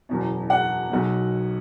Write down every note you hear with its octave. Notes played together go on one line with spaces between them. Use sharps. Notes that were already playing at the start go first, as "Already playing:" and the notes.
F#1 E2 B2
F#5
B1 B2 F#3